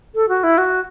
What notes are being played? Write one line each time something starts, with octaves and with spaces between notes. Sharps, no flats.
A4
F#4
E4
F#4